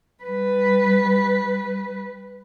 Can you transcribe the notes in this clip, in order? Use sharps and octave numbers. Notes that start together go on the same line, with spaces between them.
G3 B4